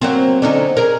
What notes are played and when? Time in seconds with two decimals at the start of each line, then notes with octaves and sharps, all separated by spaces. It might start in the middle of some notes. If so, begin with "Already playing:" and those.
0.01 F#3 A#3 C4
0.42 D3 C#4 D#4
0.77 G#4 A#4